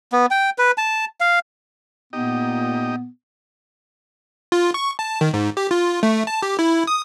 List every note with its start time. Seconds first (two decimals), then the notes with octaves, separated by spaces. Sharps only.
0.12 B3
0.31 G5
0.58 B4
0.78 A5
1.20 F5
2.13 A#2 B3 D#4 G4 D#5
4.52 F4
4.74 C#6
4.99 A5
5.21 D#3
5.34 G#2
5.57 G4
5.71 F4
6.03 A3
6.27 A5
6.42 G4
6.59 E4
6.87 D#6